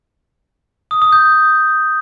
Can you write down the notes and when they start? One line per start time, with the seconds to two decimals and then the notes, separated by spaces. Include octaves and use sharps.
0.91 D#6
1.02 D#6
1.12 G6